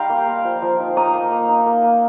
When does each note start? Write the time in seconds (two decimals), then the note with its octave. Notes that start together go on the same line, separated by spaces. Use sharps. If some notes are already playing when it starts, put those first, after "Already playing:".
Already playing: G3 D#4 F5 G5 A#5 C6
0.09 A#3
0.27 A#3
0.44 F3
0.62 F3
0.79 D#4
0.96 D#4 A#5 D#6
1.14 A#3
1.31 A#3
1.49 D#4
1.66 A#3
1.84 A#3